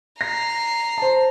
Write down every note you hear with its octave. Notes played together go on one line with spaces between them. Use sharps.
A#5 A#6 C7
C5 A5